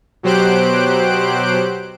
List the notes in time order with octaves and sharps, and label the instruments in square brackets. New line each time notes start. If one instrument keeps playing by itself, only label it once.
[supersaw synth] B2 F#3 G4 C5 F#6 D7